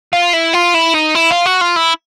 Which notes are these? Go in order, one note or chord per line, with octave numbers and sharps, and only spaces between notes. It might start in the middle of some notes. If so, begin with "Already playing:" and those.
F4
E4
F4
E4
D#4
E4
F4
F#4
F4
E4